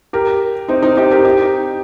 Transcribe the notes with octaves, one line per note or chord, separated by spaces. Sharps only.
G4 A#4
C4 D#4
C4 D#4
D#4 G4
G4 A#4
D#4 G4